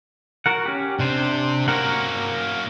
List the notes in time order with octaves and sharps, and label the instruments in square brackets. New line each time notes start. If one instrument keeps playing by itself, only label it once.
[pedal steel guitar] F#4 A#4 F#5
C#4 G4
[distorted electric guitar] C3 [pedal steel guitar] D4 C5
[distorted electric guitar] A#3 C#4 [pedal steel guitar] F#4 A#4 F#5